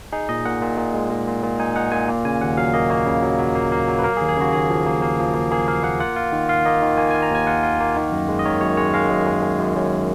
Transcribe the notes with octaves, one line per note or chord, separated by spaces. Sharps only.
D#4 G#4
A#2 D#5
A#2 F#5
A#2
A#2
G#3
A#2
A#2
A#2
D#4 G#5
D#4 F#5
A#2 G#5
A#3
C#3 G#5
D#2 F#5
F#3 F5
A#3 D#5
A#3 C#5
C#3
F#3
F#3
A#3
A#3
F#3
B4
A#3 A#4
G#4
D#2
G#4
C#3 F#4
D#2 G#4
F3
A#3
A#3
F3
A#3
A#3 G#4
A#3 F5
A#3 F#5
F4 F#5
F4
D#3
F4 F5
A#3 D#5
D#3
A#3 G#5
G#5
F4
A#5
D#2 G#5
F4 F#5
F4
A#3
D#3
F#2
G#3
D#5
D#3 C#5
F#2 C#5
G#3 C#5
G#3 F5
F#2
G#3
G#3
F#2
F#2